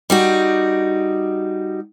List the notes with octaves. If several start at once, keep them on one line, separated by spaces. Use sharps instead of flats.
G3 D#4 F#4